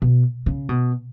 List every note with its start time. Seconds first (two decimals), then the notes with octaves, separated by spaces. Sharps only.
0.02 B2
0.46 C#3
0.69 B2